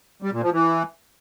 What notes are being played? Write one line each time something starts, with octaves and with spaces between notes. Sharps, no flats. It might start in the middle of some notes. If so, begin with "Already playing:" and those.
G3
A#2
F3
E3